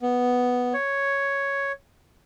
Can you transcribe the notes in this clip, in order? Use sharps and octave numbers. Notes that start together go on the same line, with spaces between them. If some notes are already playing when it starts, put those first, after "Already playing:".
B3
C#5